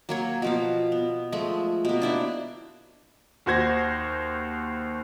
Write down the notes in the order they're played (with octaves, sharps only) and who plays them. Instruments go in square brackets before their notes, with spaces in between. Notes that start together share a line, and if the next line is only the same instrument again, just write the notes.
[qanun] F#3 A#3 C#5
B2 F3 F5
B3
F3 G#3 A3
B2 A#3
D4 E4 C5
[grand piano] D#2 F#4 C5 G#6 A#6